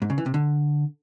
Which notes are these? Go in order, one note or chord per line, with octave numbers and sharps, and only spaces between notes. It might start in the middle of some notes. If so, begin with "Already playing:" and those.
G#2
C#3
E3
C3
D3